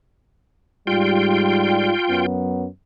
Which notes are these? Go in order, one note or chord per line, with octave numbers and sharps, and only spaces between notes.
G#2 G3 F4 G5
F#2 F#3 B3